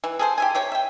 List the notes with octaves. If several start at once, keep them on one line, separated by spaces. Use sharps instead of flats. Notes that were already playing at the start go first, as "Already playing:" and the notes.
E3
G#4 A4 C5
G4 E5 G#5
C3 G4 C#5
E5 G5